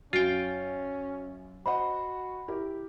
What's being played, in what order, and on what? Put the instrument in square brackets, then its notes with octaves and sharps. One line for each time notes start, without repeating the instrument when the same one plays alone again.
[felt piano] F#2 [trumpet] C#4 [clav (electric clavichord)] F4 G5 [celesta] F#4
[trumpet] F#4 [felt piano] C5 D#5 F#5 [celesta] B5
[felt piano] E4 G4 A#4